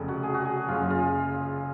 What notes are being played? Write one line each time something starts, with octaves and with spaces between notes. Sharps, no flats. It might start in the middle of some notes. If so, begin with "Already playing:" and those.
Already playing: F1 F2 C#3
F#4
G#4
F#4
G#4
F#1 F#2 C#3 F4
F4